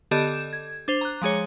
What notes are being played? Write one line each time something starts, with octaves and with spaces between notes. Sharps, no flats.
D3 B3 G4 A4 D#5 D6
G6 E7
G#6
D4 C5 F7
A#5 D6 F#6
F3 G#3 G#4 C#5